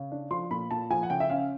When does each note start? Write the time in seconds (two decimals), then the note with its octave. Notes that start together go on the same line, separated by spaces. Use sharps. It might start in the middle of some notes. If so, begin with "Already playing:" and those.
Already playing: C#3
0.12 D4
0.31 F3 C6
0.51 A#2 B5
0.71 A#2 A5
0.90 F3 G#5
1.03 F#5
1.10 C#3 G5
1.20 E5
1.30 C#4 F5